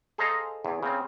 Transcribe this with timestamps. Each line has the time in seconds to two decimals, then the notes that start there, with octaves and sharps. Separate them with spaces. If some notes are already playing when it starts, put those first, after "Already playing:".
0.18 G#4 A4 C5 D#5 F5 A#5
0.65 E2
0.83 C#3 C4